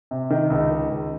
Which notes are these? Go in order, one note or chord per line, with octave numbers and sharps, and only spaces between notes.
C3
D#3
C#2
D#3
C#2